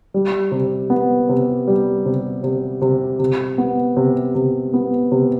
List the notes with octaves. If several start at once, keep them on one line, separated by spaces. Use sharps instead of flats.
G3
C3
B3
C3
G3
C3
C3
C3
C3
B3
C3
C3
B3
C3